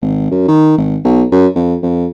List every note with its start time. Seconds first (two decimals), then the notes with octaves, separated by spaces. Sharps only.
0.02 G#1
0.31 F#2
0.48 D#3
0.78 G#1
1.04 B1
1.32 F#2
1.55 F2
1.83 F2